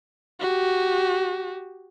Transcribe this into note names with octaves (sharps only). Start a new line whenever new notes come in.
F#4 G4